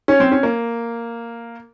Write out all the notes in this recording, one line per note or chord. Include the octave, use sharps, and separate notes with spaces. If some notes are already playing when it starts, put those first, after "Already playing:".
C#4
C4
C#4
A#3